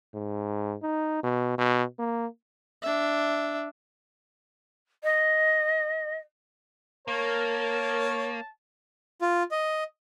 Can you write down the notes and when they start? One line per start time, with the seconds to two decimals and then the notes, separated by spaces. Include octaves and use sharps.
0.14 G#2
0.83 D#4
1.23 B2
1.58 B2
1.99 A#3
2.82 D4 E5
5.04 D#5
7.08 A#3 A#4 C#5 A5
9.21 F4
9.51 D#5